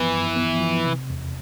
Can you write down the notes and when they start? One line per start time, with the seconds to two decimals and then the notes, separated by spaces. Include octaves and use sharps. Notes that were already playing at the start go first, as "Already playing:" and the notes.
Already playing: G2 E3 F3 B3
0.11 G2
0.36 B3
0.60 F3
0.85 C3
1.10 E2